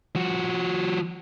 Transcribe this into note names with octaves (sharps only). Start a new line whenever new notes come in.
F3 F#4